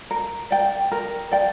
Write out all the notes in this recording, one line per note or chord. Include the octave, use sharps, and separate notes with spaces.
A#4
D5 G5
A#4
D5 G5